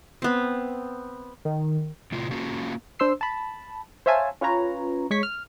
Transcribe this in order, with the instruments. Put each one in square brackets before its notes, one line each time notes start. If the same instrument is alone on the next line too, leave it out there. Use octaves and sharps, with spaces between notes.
[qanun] B3 C4
[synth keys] D#3
[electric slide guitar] A2 C3 F4
A#3 C#4 F4 F#4
[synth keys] D4 C5 C6 E6 C7
A5 B5
C5 C#5 E5 F5 G#5 A5
C#4 F4 B4 C#5 A#5
G#3 C#5 C#6 B6
F6